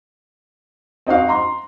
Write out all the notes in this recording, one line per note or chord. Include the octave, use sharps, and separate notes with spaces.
C4 D#4 F#4 F5
A#5 C6